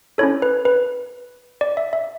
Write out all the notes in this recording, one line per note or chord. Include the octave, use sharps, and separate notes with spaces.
C#4 E4 A4 C#5
B4
B4
D5
E5
E5